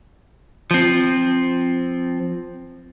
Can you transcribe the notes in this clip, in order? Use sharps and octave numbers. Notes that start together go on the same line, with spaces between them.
F3 C4